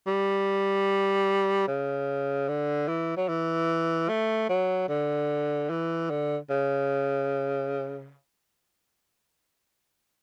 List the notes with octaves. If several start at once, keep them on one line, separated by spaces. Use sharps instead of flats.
G3
C#3
D3
E3
F#3
E3
A3
F#3
D3
E3
D3
C#3